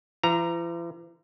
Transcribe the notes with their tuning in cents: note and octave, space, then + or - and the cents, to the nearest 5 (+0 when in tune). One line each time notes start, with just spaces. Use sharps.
E3 +45 A#5 +0